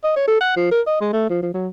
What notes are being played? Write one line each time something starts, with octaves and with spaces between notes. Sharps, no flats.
D#5
C#5
A4
F#5
F3
A#4
D#5
G#3
A3
F3
F3
F#3